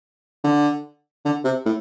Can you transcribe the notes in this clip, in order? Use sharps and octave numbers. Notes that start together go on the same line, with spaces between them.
D3
D3
C3
A2